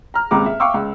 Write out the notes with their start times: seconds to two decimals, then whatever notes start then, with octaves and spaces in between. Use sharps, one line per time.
0.14 A#5 F6
0.31 D#1 C#2 G#2 C3 A#5 D6
0.46 E5
0.60 E5 F5 G5 C#6 D6 E6
0.74 C#2